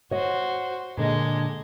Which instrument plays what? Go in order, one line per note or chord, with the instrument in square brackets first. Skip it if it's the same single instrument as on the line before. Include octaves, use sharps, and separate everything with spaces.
[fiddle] F#4 C5 [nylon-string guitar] C#5 D#5
[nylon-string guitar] A#2 D3 [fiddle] G#3 D#5